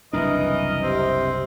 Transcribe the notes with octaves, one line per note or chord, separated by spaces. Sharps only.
F#1 C2 E3 D4 A#4 D#5
C3 C4